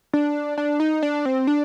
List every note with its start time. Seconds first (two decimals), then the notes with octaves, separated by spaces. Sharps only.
0.13 D4
0.58 D4
0.80 D#4
1.02 D4
1.25 C4
1.47 D4